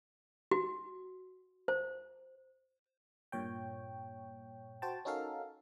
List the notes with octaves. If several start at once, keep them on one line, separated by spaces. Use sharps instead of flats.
F#4
C5
G2 A#2 C#5 G5
F#4 C5 G5 A5
C#4 D#4 F#4 A4 A#4 F5